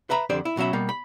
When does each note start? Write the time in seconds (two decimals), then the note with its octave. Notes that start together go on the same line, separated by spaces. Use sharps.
0.10 B4 E5 A#5 B5
0.30 F2 D3 G4 C5 D5
0.45 E4
0.57 B2 F#3 C#4 E5 B5
0.73 B2 G3 A#3
0.89 B5